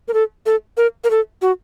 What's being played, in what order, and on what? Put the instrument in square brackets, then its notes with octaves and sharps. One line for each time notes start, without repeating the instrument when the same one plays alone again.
[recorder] A#4
A4
A4
A#4
A#4
A4
F#4